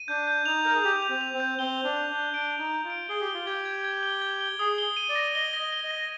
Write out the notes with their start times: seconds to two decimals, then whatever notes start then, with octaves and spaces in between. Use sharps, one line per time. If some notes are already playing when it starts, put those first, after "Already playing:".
Already playing: D#7
0.08 D4 G6
0.27 G6
0.46 D#4 F7
0.65 A#4 G6
0.75 G#4
0.84 G4 F7
1.02 F7
1.09 C4
1.21 F7
1.34 C4
1.40 G6
1.59 C4 G7
1.78 G6
1.84 D4
1.97 G6
2.10 D4
2.15 G6
2.33 D4 D7
2.53 G6
2.59 D#4
2.72 G6
2.84 F4
2.90 D7
3.09 G#4 G7
3.21 G4
3.28 G7
3.34 F4
3.45 G4 G#6
3.65 G#6
3.84 G#6
4.03 G7
4.22 G#6
4.41 G7
4.59 G#4 D#6
4.78 G7
4.97 D#7
5.09 D5
5.15 A#6
5.35 D#5 G7
5.53 A#6
5.60 D#5
5.73 G7
5.84 D#5
5.91 A#6